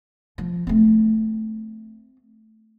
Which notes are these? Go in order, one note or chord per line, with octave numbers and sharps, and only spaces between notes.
F3
A3 C4